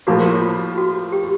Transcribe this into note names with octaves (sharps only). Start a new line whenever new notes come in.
A2 F3 A#3 F#4
F4
F#4
G4